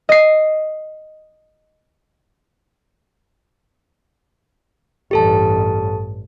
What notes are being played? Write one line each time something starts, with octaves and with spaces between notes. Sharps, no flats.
D#5 C7
A1 G2 G4 A4 A5